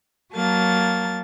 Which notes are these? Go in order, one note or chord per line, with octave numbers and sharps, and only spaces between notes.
F#3 A#3 A5 A6